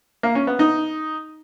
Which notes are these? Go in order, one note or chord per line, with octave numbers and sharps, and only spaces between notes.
A#3
C#4
B3
D#4